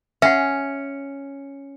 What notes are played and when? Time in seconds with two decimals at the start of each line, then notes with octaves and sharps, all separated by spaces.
0.22 C#4 E5 F#5